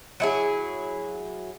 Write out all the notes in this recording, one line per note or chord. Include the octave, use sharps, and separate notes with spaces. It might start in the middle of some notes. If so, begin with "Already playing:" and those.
F#3 E4 G#4